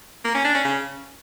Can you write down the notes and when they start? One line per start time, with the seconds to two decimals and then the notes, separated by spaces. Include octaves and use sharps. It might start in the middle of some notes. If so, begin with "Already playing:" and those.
0.25 A#3
0.35 C#4
0.44 D4
0.54 C#4
0.64 C#3